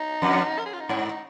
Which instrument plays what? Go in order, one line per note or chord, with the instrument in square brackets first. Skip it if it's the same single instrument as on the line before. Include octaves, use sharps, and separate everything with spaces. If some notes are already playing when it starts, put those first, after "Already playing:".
Already playing: [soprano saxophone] D#4
[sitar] F2
[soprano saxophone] A#4
G#4
F4
D#4
[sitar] G#2 [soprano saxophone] C#4
[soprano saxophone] D#4
D#4